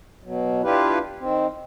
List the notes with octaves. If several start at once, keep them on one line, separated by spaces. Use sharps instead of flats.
B2 F#3
D4 E4 F4 G4 B4
D#3 C4